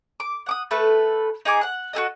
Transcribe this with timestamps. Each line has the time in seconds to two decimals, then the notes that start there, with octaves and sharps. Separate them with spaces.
0.20 D6
0.46 F#5 D6 D#6
0.71 A3 A4 B4
1.45 D#4 G#4 G#5 D6
1.61 F#5 F#6
1.93 F#4 G#4 A4 D#5